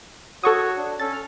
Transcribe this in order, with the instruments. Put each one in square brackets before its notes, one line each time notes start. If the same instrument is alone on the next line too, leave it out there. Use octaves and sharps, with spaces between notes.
[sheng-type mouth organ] F#4 C#5 [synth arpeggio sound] A4 C#6 D#6
[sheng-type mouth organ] D4
[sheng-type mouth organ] C#4 A4 [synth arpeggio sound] A6
[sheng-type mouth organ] F6